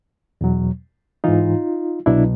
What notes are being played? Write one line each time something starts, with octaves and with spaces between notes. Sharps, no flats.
E2 B2 F#3
G#2 E3 D#4 F4
C2 B2 F#3 D4 E4